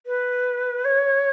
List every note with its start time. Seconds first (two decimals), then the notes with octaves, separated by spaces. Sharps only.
0.06 B4
0.85 C#5